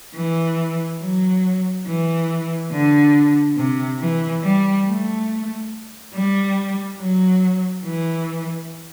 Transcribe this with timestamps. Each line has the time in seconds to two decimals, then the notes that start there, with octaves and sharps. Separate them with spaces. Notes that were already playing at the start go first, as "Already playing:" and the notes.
0.15 E3
1.01 F#3
1.87 E3
2.72 D3
3.57 C3
4.00 E3
4.43 G3
4.85 A3
6.14 G3
7.00 F#3
7.85 E3